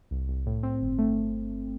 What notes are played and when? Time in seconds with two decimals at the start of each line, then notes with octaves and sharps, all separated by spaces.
0.11 C2
0.28 C2
0.46 A2
0.63 C4
0.81 G1
0.98 A3